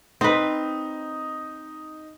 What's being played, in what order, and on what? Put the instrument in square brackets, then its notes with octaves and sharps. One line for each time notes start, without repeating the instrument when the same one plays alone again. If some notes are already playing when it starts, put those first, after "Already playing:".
[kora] C4 B4 [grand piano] D#4